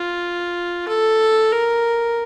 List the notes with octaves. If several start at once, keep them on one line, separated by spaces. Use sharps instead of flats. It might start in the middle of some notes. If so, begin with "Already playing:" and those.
Already playing: F4
A4
A#4